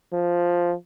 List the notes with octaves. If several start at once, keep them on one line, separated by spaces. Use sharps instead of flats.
F3